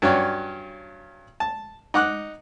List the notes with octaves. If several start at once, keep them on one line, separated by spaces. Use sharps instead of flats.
G2 F#3 C#4 C#5 D5
A5
D#4 F#5 D6 F#6